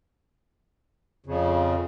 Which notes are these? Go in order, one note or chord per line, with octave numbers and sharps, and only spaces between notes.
F2 C#3